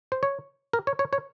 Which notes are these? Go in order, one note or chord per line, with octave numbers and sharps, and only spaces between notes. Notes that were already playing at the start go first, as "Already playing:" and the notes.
C5
C#5
A#4
C#5
C#5
C#5